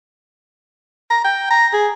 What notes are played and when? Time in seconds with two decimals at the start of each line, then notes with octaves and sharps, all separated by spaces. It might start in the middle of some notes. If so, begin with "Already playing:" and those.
1.10 A#5
1.24 G5
1.50 A#5
1.73 G#4